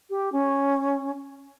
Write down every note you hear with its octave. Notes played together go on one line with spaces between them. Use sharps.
G4
C#4